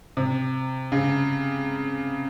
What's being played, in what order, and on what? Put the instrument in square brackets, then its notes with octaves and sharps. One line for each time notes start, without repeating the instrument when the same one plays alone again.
[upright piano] C3
C#3